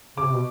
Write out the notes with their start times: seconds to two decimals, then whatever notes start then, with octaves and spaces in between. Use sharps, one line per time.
0.17 C#3 D6
0.25 C3
0.33 B2